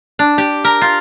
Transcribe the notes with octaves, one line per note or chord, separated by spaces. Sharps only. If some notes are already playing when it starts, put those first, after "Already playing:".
D4
G4
A#4
F4